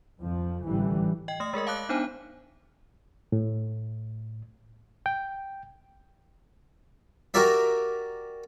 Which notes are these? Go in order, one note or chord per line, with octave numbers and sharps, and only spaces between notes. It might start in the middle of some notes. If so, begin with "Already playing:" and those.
F2 F3
A1 D3 E3 G3
D#5 G5
A3 D#6
G#3 G#4 A#4 D#5
F5 A5 D6 F#6
B3 D4 D#4 C5 G#5
A2
G5
F#4 G4 A#4 D5 E5